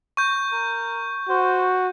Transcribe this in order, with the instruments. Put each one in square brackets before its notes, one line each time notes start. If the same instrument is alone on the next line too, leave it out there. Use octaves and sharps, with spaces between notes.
[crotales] C#6 G6
[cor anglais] A#4
[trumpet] F#4 [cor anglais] C5